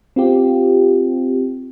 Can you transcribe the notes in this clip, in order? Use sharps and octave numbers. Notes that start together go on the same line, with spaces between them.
C4 F4 G4